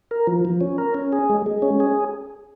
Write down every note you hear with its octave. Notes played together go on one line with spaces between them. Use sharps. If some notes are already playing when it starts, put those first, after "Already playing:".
A#4
F3
F3
C#4
A#4
C#4
G#4
G#3
G#3
C#4
G#4